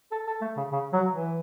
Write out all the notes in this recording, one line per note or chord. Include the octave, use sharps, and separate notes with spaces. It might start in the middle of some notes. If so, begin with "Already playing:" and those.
A4
A4
A3
C#3
C#3
F#3
E3